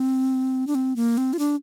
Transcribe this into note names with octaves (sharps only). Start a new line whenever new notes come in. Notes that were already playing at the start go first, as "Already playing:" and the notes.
Already playing: C4
D4
C4
A#3
C4
F4
D4